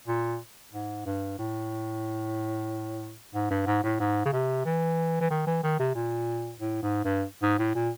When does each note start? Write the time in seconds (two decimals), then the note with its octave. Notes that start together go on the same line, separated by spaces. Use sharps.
0.08 A#2
0.73 G#2
1.06 G2
1.39 A2
3.34 G#2
3.50 G2
3.67 G#2
3.83 A2
4.00 G#2
4.25 C#3
4.33 C3
4.65 E3
5.20 E3
5.30 D#3
5.47 E3
5.64 D#3
5.79 C3
5.95 A#2
6.60 A2
6.83 G#2
7.05 G2
7.42 G#2
7.59 A2
7.75 A#2